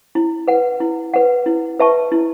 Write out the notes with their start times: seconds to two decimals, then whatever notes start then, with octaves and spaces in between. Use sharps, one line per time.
0.15 E4
0.48 B4 F#5
0.80 E4
1.14 B4 F#5
1.46 E4
1.79 B4 E5 A5 C#6
2.12 E4